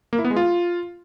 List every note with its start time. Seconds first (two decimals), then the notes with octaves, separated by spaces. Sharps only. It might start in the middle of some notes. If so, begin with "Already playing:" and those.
0.13 A#3
0.19 E4
0.25 B3
0.31 G#3
0.36 F4